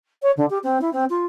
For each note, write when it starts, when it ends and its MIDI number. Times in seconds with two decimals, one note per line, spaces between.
0.22 0.31 73
0.37 0.46 50
0.50 0.58 67
0.63 0.78 60
0.81 0.90 64
0.93 1.05 60
1.10 1.26 65